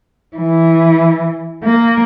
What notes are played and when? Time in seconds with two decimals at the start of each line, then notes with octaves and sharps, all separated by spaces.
0.37 E3
1.64 A#3